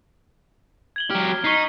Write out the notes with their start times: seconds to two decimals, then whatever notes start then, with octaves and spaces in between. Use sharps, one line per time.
0.96 G#6 F#7 G7
1.10 F#3 G4 F6
1.44 D#4 C#6 B6 C7